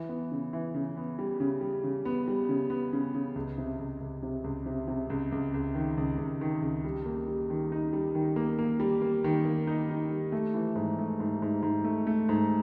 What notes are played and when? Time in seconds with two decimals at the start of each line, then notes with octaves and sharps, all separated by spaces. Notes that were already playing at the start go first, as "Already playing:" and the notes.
Already playing: E3
0.09 B3
0.31 C#3
0.53 E3
0.74 C#3
0.97 B3
1.19 G3
1.40 C#3
1.61 G3
1.84 C#3
2.05 B3
2.27 G3
2.49 C#3
2.70 B3
2.93 C#3
3.14 C#3
3.35 C#2
3.58 C3
3.79 C#2
4.01 C#2
4.23 C3
4.44 C#2
4.66 C3
4.88 C3
5.10 C#2
5.32 C#2
5.54 C#2
5.75 D#3
5.97 C#2
6.18 C#2
6.41 D#3
6.62 C#2
6.84 G3
7.06 A#3
7.28 G3
7.50 D#3
7.72 D#4
7.93 G3
8.15 D#3
8.36 A#3
8.59 A#3
8.80 G3
9.02 A#3
9.24 D#3
9.45 A#3
9.67 D#4
9.90 D#4
10.11 G3
10.32 A3
10.54 E3
10.76 G#2
10.99 A3
11.20 G#2
11.42 G#2
11.63 G#2
11.84 A3
12.07 A3
12.29 G#2